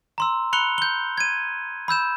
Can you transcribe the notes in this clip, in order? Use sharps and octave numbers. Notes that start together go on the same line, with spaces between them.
A#5 C6 E6
B5 F#6 C#7 F7 G7
G6 G7
G#6 D#7
B5 E6 G6 E7